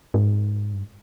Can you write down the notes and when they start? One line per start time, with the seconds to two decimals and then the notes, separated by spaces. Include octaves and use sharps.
0.14 G#2
0.74 G2